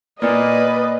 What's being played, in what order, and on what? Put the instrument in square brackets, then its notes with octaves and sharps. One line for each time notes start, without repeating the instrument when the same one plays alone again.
[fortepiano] A#2 A#3 [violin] B4 [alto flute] D5 [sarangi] D#5